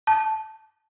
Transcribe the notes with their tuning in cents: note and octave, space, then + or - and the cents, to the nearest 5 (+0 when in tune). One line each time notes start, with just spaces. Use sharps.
A5 -10